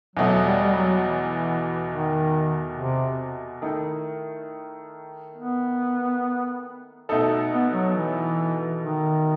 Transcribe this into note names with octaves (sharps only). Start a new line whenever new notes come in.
E2 B2 F#3 A3
G3
G3
F#3
E3
D#3
C3
D#3 A3 E4
B3
B2 A3 D#4 A4
B3
F#3
E3
D#3